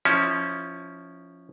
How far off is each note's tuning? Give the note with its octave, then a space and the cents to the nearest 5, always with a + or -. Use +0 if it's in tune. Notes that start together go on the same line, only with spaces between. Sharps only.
F3 +0 C#4 +0 E4 -25